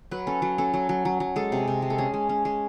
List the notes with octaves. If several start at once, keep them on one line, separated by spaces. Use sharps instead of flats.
F#3 B4
C#4 A4
F#3
C#4 A4
F#3
F#3
F#3
F#3
G#3 A4
C3
C3
G#3
A4
C#4 G#4
G#3
C#4
G#3